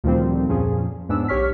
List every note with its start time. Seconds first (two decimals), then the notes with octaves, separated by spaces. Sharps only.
0.04 D2 A#2 D#3 F3 G3 C4
0.48 F2 A#2 F3 C#4 G#4
1.09 E2 G#2 B3 C#4 D4 E6
1.28 B1 G4 C#5 C#6 F6 B6